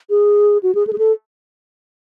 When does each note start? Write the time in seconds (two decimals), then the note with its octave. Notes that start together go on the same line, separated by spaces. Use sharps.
0.10 G#4
0.63 F#4
0.75 G#4
0.87 A4
0.93 G#4
0.98 A4